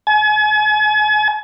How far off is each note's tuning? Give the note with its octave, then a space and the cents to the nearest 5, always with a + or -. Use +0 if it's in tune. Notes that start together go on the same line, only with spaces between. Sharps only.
G#5 +40